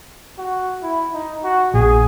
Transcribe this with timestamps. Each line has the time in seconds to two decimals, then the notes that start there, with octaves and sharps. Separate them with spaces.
0.38 F#4
0.83 E4
1.14 D#4
1.44 F#4
1.74 A#1 A#2 G#4